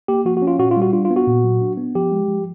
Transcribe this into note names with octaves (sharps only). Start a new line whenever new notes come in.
A#3 G4
F3 F#4
F#4
C#4
F4
A#2 F#4
F4
G3 F#4
D4 F4
F4
B3
F#4
A#2
F#3
D4
B3
F3 G4
G#3
F3